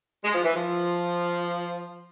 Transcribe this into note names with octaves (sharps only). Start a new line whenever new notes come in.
G#3
F3
E3
F3